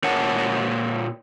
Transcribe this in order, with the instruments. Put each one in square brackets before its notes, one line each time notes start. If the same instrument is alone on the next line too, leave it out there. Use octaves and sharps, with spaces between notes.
[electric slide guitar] A#2 A#4 C#5 F#5 A5